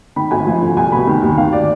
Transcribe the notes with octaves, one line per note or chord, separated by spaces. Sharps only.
D#3 B5
G#1 G#5
F3
D3
C2 G#5
B2 B5
D#3
D#2
D#3 F5
D5